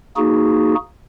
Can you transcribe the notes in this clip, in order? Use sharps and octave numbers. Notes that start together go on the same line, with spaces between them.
A#3 D#4 F#4 G#4